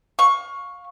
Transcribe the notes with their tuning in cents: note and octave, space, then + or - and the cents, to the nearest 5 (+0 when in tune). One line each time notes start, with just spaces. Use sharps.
F5 +30 C#6 +0